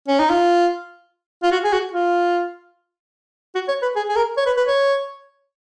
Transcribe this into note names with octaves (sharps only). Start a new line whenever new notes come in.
C#4
D#4
F4
F4
F#4
G#4
F#4
F4
F#4
C#5
B4
G#4
G#4
A#4
C#5
B4
B4
C#5